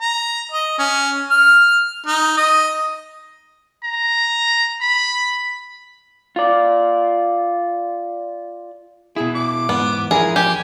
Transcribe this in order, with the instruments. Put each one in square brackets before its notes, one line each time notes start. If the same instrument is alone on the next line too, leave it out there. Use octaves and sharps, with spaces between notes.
[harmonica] A#5
D#5
C#4
F6
D#4
D#5
[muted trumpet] A#5
B5
[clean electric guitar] F4 D5
[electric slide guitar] B2 E4 [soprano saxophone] G#4
[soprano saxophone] D6
[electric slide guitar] E2 G#2 [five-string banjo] B3
[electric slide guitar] E2 F3 A#4 [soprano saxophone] E4 [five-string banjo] G#4
[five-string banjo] G4 [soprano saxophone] G#5